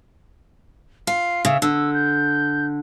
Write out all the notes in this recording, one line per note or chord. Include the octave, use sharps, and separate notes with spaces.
F4 C7
C#3 E5
D3 E6
G6